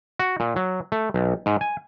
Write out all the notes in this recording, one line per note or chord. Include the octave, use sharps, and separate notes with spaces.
F#4
A#2
F#3
A3
B1
G#2
G#5